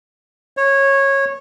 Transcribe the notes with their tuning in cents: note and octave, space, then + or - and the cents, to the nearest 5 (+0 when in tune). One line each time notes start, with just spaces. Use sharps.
C#5 -15